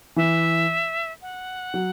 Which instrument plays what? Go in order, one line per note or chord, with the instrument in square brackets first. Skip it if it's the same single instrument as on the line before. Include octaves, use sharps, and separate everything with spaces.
[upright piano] E3 [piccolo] E5
[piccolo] F#5
[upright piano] F#3